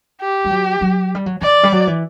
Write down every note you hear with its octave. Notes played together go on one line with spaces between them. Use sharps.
G4
G3
F#3
F#3
G3
F#3
E3 D5
G3
F#3
E3